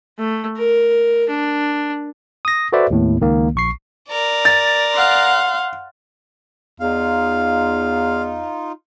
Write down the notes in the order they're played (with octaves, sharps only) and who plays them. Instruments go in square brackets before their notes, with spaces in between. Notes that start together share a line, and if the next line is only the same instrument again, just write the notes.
[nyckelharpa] A3
A#4
D4
[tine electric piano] D#6 A#6
F#4 A4 B4 C5 D5 E5
D#2 A2 B3
C#2 D#3 A#3
A#1 C#6 C7
[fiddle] A#4 D5
[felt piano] A6
[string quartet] F5 F#5 C6
[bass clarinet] E2 [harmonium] D#4 F4 [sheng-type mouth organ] F5